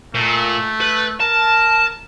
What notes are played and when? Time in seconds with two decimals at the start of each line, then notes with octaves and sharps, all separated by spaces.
0.15 A#2 A3
0.81 B4
1.21 A#4 A5